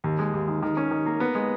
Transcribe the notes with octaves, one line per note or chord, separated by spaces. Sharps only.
D#2
G#3
D#2
D#3
D#3
C#4
D#3
A#3
B3
G#3